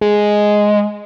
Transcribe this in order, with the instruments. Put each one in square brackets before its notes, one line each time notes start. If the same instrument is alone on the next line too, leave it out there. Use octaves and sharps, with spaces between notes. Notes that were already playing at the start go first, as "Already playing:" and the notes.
[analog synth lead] G#3